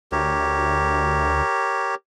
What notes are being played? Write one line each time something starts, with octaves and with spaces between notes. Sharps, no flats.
D2 G4 A#4 C#5